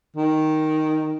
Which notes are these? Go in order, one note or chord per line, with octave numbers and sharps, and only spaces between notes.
D#3